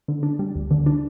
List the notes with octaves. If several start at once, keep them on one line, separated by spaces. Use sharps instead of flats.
D3
D4
G3
D2
D3
D4